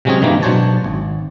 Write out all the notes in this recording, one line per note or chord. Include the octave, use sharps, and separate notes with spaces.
C3 F#3 G#3 C4 C#4 G#4
G2 D#3 E3 G#3 A#3
B2 F#3 D4 C5 C#5 A5
G#1